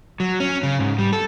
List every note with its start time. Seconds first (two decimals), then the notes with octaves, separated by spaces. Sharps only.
0.20 F#3
0.40 C#4
0.63 C#3
0.79 G#2
0.98 G3
1.13 A4